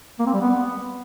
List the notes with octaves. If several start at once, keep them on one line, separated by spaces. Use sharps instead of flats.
A#3
C4
G3
B3